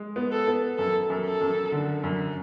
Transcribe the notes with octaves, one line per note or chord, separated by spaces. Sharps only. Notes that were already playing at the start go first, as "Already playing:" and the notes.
Already playing: G#3
B3
A4
B3
F#2 A4
F#2
A4
F#2
D3
F#2